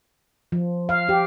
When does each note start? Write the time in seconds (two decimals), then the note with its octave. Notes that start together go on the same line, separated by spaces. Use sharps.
0.52 F3
0.89 F5
1.09 G4